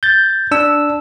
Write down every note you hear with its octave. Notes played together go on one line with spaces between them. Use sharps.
G6 A6
D4 E6